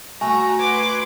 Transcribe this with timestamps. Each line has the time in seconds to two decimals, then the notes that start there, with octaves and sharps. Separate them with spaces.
0.21 A3 F#4 G#5 A#5
0.59 B4 C6 D6 G#6